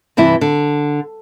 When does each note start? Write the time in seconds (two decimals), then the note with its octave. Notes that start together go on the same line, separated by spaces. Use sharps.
0.17 G2 C3 E3 E4
0.41 D3